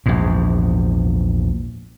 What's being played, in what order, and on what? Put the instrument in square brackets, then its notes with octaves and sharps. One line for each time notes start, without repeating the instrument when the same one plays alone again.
[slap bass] A#1 E2 G#2